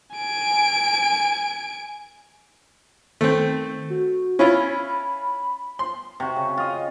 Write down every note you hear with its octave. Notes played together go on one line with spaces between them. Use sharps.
G#5 D7
D#3 A3 C4
F#4
C#4 E4 F4 B5
C6
C3 F#4
C#3
F4 D#5